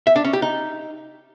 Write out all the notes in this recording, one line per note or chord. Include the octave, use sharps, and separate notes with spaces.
E5
D4
C#4
G4
D#4